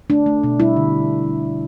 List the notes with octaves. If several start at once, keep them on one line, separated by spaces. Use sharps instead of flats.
A3 D4
A3
B2
G3 E4
D3